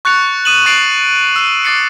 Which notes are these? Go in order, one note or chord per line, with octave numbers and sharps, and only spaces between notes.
C#6 F#6 A6 C#7 F7
D#6 D#7 E7 F#7
C#6 A6 C7 D7 F7 F#7
E6 D#7
C#6 D6 A6 C7 C#7